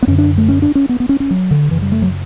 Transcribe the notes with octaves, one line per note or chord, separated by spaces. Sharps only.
B3
F#2 D3 C#4
D4
A3
C#4
D4
C#4
B3
B3
C#4
C#4
F#3
D3
F#2 C#3 E3
G3
A3
F#3